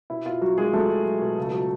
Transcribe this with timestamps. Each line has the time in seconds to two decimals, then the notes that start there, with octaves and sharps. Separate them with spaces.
0.10 B2 E4
0.26 B2 F4
0.41 F#3 F#4
0.57 F#3 G#3 G#4
0.73 F#3 A3 A4
0.90 F#3
1.06 F#3
1.22 B2
1.38 C#2
1.54 F#3